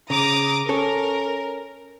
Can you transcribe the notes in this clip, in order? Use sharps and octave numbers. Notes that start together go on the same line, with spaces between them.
C#3 A#5 D6 D#6
C#4 A4 A#4